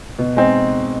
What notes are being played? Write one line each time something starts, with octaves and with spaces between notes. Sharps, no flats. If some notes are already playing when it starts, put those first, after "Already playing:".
B2
G#3 C4 D#4